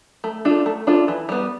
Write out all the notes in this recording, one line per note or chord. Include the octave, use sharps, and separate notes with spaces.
A3
D4 F4 A4
A3
D4 F4 A4
E3
G3 B3